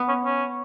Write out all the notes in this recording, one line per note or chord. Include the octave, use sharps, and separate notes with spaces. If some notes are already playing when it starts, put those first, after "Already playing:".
Already playing: B3
C#4
C#4